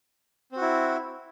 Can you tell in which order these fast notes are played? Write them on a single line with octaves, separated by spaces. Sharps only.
C4 F#4 E4